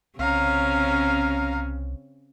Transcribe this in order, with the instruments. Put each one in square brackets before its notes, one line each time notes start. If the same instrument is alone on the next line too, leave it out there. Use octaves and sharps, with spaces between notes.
[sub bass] C2 [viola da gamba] C#3 C4 C#4 [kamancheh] F5 A#5